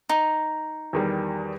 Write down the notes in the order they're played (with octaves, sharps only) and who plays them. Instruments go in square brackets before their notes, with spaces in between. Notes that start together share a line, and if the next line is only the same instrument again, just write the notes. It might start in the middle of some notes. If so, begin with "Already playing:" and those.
[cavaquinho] D#4
[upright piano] E2 D#3 G3